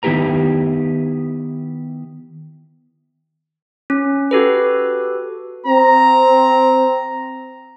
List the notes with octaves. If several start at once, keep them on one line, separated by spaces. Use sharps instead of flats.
D#3 B3 E4 G4 B4 A#5
C#4
F#4 G4 A4 B4
C4 A#5